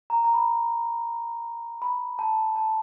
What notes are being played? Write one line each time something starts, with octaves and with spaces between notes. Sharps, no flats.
A#5
A#5
B5
B5
A5
A5